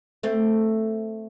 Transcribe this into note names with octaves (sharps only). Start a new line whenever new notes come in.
A3 C4